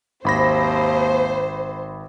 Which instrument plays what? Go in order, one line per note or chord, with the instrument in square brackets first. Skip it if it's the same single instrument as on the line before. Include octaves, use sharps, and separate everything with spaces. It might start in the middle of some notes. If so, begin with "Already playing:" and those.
[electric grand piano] G#1 B5 A#6 [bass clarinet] D#2 [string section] C5